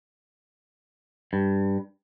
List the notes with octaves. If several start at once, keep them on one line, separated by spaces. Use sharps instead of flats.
G2